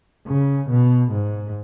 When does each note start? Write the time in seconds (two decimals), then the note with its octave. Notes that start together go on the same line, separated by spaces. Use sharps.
0.27 C#3
0.70 B2
1.12 G#2